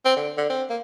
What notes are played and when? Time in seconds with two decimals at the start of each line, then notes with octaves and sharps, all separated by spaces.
0.05 C4
0.16 D3
0.37 D3
0.49 C4
0.69 A#3